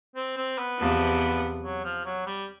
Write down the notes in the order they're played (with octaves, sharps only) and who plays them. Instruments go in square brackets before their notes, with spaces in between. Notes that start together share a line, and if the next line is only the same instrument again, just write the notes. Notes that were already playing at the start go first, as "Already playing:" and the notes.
[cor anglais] C4
C4
B3
[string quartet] E2 C3 F3
[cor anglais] F#3
F3
F#3
G3